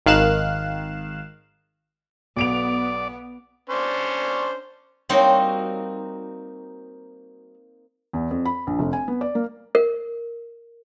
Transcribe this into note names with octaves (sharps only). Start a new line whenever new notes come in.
G#1 D#3 F5 F#6 E7
B1 B3 D5 D7 F7
C#4 D4 C5
G3 A#3 C4 D#4 F#4 C#5
E2
F2
B5
A#1
F1
G#5
B3
D5
A#3
A#4